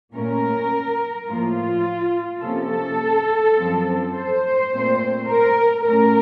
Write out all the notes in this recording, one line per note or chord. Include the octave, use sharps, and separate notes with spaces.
A#2 A3 C#4 A#4
A2 F3 A#3 F4
C3 F3 A#3 C#4 A4
F#2 F3 C4
C5
A#2 A3 C4
A#4
A2 A3 C#4 A#4